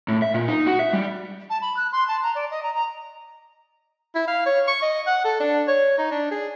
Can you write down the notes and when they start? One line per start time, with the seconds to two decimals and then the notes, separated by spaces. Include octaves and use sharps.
0.08 A2
0.22 E5
0.34 A#2
0.48 D#4
0.66 F#4
0.79 E5
0.93 G3
1.50 A5
1.62 B5
1.77 F#6
1.92 C6
2.08 A5
2.23 A#5
2.35 D5
2.51 D#5
2.63 A#5
2.75 A#5
4.15 E4
4.28 F5
4.46 C#5
4.67 C#6
4.82 D#5
5.07 F#5
5.24 A4
5.40 D4
5.68 C#5
5.98 D#4
6.11 D4
6.31 G#4